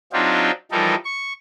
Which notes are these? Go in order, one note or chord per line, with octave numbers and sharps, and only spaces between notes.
F#3 C4 D4 D#4 F4 G4
E3 F3 G3 D#4 A4 A#4
C#6